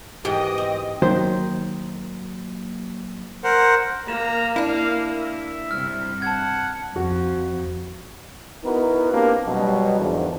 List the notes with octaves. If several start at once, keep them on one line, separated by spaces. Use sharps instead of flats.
G#2 B2 E3 G4 D#5 G5 D#6
C4
D#3 F#3 A#3 C5
A#4 C5 F#5
A#3 A#5 E7
D4 E4 F5
E5
G2 C3 F6
F#5 A5 G#6
F2 F#4
B3 D#4 E4 F#4 A#4 B4
A#3 C4 D4 G4 A#4 B4
B2 F#3 G3
E2 G#2 D3 D#3 F3 D4